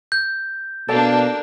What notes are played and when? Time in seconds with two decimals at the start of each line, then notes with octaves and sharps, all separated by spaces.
0.12 G6
0.88 B2 A#3 D4 A4 D5 G5